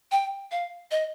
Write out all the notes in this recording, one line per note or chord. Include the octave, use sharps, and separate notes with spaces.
G5
F5
D#5